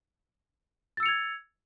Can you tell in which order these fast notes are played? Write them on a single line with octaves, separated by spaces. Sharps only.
A6 E6 C#7 F7 G#6